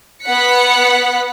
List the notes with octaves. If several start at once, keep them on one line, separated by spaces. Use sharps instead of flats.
B3 F#5 F#6 B6 C#7